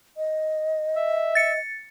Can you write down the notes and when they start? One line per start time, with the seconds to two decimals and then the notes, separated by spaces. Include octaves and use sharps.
0.17 D#5
0.96 E5
1.35 A6 C#7